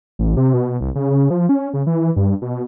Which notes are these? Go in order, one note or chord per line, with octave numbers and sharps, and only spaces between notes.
A1
C3
B2
C2
C#3
C#3
F3
C#4
C#3
E3
G2
B2